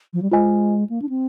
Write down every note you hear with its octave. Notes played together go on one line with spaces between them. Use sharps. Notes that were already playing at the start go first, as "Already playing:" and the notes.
F3
G3
G#3 F4 C5 D#5 G#5
A#3
D4
C4